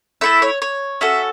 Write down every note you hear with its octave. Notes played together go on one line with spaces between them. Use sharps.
A3 E4 A4 E5
C#5
C#5
C#4 F#4 A4 E5